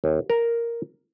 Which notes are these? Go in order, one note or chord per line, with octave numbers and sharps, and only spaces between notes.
D#2
A#4